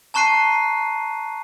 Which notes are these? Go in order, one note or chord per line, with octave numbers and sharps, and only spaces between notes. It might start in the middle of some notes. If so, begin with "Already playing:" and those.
A5 A#5 C#6 F#6 C7 D#7